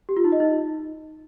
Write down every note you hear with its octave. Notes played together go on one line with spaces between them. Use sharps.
G4
F4
D#4
D#5
D#4